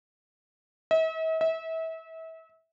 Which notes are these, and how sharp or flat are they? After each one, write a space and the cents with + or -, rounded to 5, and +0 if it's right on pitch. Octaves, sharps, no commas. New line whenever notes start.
E5 -45
E5 -30